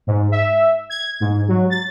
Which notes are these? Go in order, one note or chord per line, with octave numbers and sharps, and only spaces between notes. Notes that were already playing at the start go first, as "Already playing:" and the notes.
G#2
E5
G#6
G#2
F#3
A6